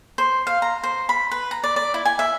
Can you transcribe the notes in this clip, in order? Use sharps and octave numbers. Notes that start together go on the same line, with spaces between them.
C5
F5
A#5
C5
B5
B4
A#5
D5
D5
E4
G#5
E5